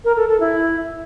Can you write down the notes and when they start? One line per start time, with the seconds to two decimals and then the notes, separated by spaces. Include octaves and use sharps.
0.05 A#4
0.16 A4
0.28 A4
0.40 E4